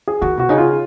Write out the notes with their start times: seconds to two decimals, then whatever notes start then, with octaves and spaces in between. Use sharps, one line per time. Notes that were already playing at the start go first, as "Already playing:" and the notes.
0.07 G#4
0.21 D#3 F#4
0.37 B2 F#4
0.49 C#3 D#4
0.58 F4